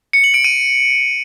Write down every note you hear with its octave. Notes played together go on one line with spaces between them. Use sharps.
C#7
F#7
D7
D#7